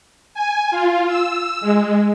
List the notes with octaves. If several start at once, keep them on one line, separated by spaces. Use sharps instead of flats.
G#5
F4
E6
G#3